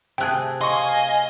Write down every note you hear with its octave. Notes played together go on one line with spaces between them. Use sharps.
C3 A3 G#4 G5 F#6
D#5 F5 G#5 C6 C#6